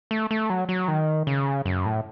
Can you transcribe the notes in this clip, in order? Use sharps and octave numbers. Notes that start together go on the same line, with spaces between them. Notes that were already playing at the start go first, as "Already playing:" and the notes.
A3
A3
F#3
F#3
D#3
C#3
F#2
A2